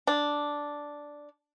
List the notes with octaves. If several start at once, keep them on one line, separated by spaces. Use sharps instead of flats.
D4